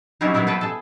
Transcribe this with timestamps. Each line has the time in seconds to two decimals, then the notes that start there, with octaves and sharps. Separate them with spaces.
0.21 F#3 G3 C4 C#4 D#4 E4
0.34 F#3 B3 C4 E4 A#4
0.47 B3 C4 A4 B4 G5
0.61 G#4 A4